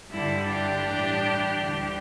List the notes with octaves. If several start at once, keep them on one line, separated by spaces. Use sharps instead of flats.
G2 D3 G3 E4
D4 G4
A2 E3 G3
D2 D3 G3